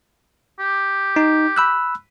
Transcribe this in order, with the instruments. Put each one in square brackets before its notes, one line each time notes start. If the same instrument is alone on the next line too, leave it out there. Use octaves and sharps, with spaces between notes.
[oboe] G4
[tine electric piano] D#4
B5 E6 F#6